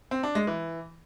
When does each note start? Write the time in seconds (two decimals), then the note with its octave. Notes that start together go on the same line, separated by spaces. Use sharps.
0.11 C4
0.23 D4
0.35 G#3
0.47 E3